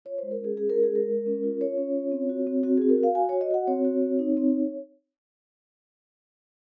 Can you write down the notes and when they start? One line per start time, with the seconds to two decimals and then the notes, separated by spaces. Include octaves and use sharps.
0.05 F4 C#5
0.18 G#3 C5
0.31 A#4
0.40 C#4 G#4
0.57 C#4 G#4
0.70 G#3 A#4
0.83 G#4
0.92 G#3 A#4
1.09 G#3
1.26 C#4
1.43 F4
1.61 F4 C#5
1.77 C#4
1.96 F4
2.12 C4
2.29 F#4
2.47 C4
2.63 C4 F#4
2.77 F#4 G#4
2.89 A#4
2.98 F#4
3.03 F5
3.15 F#4 G#5
3.29 F#4 C#5
3.41 D#5
3.51 F#4 F#5
3.67 C4 C#5
3.85 F#4
4.02 C4
4.19 D#4
4.37 C4